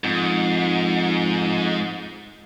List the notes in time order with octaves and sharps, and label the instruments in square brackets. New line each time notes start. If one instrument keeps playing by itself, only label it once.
[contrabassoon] F2 [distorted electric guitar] G#2